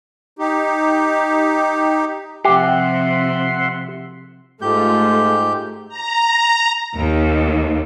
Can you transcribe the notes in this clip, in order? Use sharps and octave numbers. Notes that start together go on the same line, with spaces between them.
D#4 G4
C3 F3 G4 E5 F#5 C6
G#2 A3 F4 G4 G6
A#5
D#2